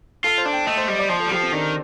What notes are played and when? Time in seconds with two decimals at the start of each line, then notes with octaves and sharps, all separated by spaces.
0.24 F4 A4
0.38 C5
0.46 D4
0.52 G5
0.67 A3 D#5
0.77 C5
0.88 G3 D#5
0.99 D5
1.10 F3 C5
1.20 A4
1.26 G3
1.31 F3 G4
1.43 C4
1.52 D#3 D4